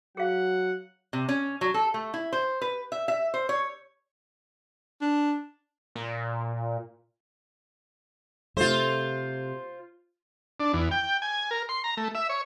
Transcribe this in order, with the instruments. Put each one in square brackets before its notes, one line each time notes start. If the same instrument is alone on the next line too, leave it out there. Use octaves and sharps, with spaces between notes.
[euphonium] F#3 [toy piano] G#4 F5 [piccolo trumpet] F#5
[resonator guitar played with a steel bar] C3
C#4
F#3
A4
A3
E4
C5
B4
E5
E5
C5
C#5
[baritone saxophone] D4
[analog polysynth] A#2
[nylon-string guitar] C3 A3 [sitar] F4 C5
[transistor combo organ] D4
E2
G5
G#5
A#4
C6
A#5
A3
E5
C#5